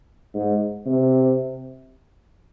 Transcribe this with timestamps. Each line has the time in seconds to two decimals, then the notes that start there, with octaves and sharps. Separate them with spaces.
0.34 G#2
0.86 C3